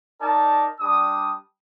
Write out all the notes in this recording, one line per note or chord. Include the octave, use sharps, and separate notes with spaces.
D#4 A#4 D5 A5
G3 D4 D#6